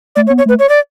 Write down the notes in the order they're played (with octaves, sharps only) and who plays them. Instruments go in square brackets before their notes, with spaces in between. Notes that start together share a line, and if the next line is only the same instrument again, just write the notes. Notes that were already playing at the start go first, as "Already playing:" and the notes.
[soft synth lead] A3 [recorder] D5
[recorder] C#5
[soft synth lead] B3
[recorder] C#5
[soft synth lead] A3 [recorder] B4
[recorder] C#5
D5